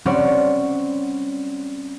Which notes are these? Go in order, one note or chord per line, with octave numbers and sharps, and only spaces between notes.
G3 C4 C#4 C#5 D5 F#5